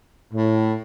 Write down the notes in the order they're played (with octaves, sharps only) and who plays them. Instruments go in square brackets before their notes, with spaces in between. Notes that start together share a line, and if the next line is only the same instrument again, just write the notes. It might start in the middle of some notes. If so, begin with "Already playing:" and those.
[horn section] A2